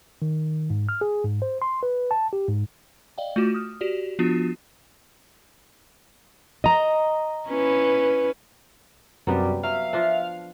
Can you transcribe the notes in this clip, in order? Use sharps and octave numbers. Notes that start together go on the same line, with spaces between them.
D#3
G#2
F6
G#4
G#2
C5
C6
B4
A5
G4
G#2
D5 D#5 F5 G5
A3 F4 F#4 D6
D#6 F6
F#4 G4 D5
F3 B3 D4 F4 F#4
D#5 A#5
C#4 E4 B4
F#2 C3 F#3 G3 B3 G4
F#3 E5 F5
F3 D4